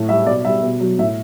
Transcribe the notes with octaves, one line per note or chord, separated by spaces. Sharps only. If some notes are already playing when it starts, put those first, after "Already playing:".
Already playing: A2
G3 E5
B2 D5
G3 E5
B2
F#3
A2 E5